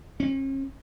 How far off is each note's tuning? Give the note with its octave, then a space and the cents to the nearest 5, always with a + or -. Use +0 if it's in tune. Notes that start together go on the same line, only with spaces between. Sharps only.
C#4 -45